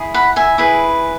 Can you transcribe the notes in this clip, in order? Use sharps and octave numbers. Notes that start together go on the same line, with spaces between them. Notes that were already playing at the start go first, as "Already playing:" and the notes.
Already playing: E4 G#4
F#5 B5
E5 G#5
E4 G#4 B4